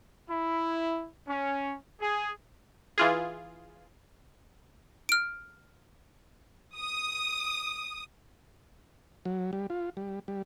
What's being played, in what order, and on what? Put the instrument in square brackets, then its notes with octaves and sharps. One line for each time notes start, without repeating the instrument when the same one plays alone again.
[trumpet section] E4
C#4
G#4
[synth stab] E3 F4 G#4
[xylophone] F6 D7
[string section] D#6
[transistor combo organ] F#3
G3
F4
G3
G3